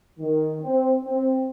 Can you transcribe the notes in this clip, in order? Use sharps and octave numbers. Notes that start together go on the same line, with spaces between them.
D#3
C4
C4